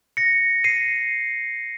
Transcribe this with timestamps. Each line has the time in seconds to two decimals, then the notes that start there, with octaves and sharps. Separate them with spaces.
0.17 A#6 C#7
0.64 C7 D#7